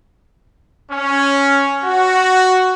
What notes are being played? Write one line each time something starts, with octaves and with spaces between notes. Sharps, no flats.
C#4
F#4